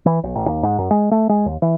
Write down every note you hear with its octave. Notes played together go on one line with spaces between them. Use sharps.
E3
B1
A1
D#2
G#2
F#2
G#3
A3
G#3
D#2
E3